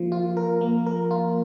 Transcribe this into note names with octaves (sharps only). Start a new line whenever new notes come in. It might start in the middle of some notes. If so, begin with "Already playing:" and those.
Already playing: F3 A#3 F4
F4
A#4
A#3
A#4
F4